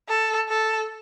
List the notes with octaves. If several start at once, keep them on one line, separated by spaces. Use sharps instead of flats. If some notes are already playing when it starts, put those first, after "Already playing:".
A4
A4